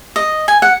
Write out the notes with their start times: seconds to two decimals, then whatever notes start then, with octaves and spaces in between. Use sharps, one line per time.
0.16 D#5
0.48 G#5
0.62 F#5